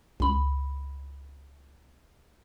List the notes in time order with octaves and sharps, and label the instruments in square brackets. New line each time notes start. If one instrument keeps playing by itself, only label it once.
[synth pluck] C#2 B5